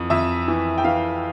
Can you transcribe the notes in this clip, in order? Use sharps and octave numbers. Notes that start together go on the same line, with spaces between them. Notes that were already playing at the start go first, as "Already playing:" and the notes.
Already playing: F2 E3
F2 E5
E3
G5
E3 F5